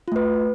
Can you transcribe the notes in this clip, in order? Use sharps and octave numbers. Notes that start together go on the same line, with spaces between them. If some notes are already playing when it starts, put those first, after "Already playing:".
A3 F4 B4